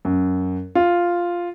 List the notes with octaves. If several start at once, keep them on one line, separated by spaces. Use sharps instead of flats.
F#2
F4